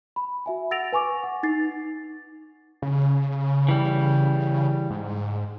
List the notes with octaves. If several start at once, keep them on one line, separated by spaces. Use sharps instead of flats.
B5
F#4 E5 G#5
F#5 E6 A6 A#6 D7 F7
B4 G#5 C#6 D6
F#5
D#4 A6 C7
C#3
E3 G3
G#2